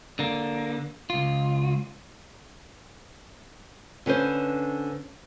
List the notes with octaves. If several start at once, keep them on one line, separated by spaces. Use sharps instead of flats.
D3 A#3
C#2 F4
D3 C#4 B4 C5